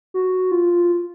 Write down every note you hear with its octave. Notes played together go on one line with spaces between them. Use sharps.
F#4
F4